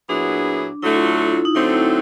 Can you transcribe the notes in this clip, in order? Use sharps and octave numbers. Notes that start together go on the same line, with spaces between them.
A#2 F#3 B3 D4 E4 G#4
D3 F#3 A3 E4
F4
E4
F4
D#4
D3 F#3 A3 C4 E4